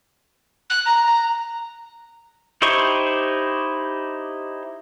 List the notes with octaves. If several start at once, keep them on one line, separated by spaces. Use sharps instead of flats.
F#6
A#5
A#5
D#4 E4 G4 C5 C#6